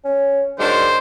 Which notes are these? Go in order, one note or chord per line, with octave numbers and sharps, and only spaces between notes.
C#4
D#3 F#3 G#3 D4 C5